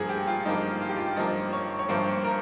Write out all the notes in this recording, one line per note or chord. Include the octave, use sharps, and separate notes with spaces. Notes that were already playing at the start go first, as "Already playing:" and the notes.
Already playing: G2 F3 A#3 G#4
G4
F4
G2 F3 A#3 D#4
F4
G4
F4
G2 F3 A#3 D#5
C#5
C#5
G2 F3 A#3 C5
A#4